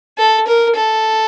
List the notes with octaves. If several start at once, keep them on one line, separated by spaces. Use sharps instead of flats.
A4
A#4
A4